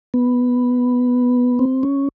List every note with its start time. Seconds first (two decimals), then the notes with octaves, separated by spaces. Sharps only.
0.14 B3
1.59 C4
1.83 C#4